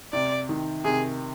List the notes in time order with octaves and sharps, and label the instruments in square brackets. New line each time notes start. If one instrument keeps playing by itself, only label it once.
[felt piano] C3 [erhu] D5
[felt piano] D#3
[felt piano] C3 [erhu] G#4